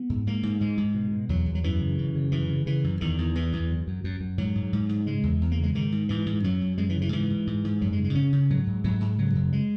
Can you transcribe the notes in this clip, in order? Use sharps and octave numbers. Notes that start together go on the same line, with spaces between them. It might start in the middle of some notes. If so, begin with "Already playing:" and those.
Already playing: B3
G#2
G#2 A#3
G#2
G#2 G#3
G#2
B2
B2
E2 F#3
E2
F#3
F#2 E3
C#3
F#2
C#3
F#2 E3
C#3
C#3 E3
F#2
E2 D#3
E2
E2 E3
E2
F#2
F#2
F#2
F#2
G#2 F#3
G#2
G#2
G#2
C#3 G#3
E2
E2
A#3
C#3
G#3
G#2 D#3
G#2
G#2 E3
G#2
F#2 F#3
F#2
F#2 G#3
E3
C#3
E3
G#2 E3
G#2
G#2
G#2
F#2 F#3
G#3
C#3
G#3
C#3 C#4
C#3
G#2 F#3
G#2
G#2 F#3
G#2
C#3 F#3
F#2
G#3